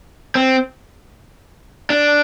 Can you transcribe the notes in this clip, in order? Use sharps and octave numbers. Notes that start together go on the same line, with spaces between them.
C4
D4